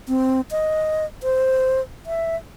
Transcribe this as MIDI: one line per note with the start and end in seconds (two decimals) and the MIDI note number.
0.08 0.41 60
0.51 1.05 75
1.23 1.80 72
2.06 2.36 76